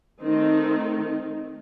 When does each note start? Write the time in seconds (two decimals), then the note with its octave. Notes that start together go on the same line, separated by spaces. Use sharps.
0.23 D#3 A3 C4 D#4